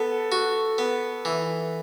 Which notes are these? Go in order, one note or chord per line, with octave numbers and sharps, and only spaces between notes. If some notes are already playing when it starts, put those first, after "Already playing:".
Already playing: B3 A4
F#4
B3
E3